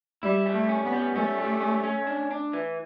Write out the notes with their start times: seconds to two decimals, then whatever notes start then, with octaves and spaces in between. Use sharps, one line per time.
0.23 G3 E4
0.46 G3
0.54 A3
0.69 C#4
0.84 B3
0.92 G3
1.15 A3 C#4
1.38 G3
1.61 C#4
1.84 C#4
2.07 D4
2.31 D4
2.53 E3